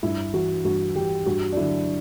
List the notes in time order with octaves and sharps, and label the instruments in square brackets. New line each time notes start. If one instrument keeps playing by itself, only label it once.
[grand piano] G2 E4
E3 F#4
G2 F#4
E3 G4
G2 F#4
D4
D3 F#3 E4